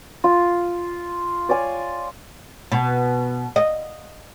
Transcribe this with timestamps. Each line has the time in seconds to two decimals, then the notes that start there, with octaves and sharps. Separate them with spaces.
0.24 F4
1.49 C#5 D5 F5 G#5
2.72 B2
3.56 D#5